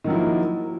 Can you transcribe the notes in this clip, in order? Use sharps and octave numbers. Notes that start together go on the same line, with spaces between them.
D#3 F3 F#3 A#3 E4